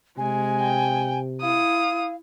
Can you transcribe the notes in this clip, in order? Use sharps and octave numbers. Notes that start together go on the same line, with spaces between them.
C3 G#3 G#5
G5
E4 F5 D#6